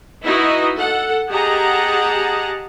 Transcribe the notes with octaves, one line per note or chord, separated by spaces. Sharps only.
D#4 E4 F#4 B4 D#5
A4 F#5
G4 G#4 D#5 F#5 A5 A#5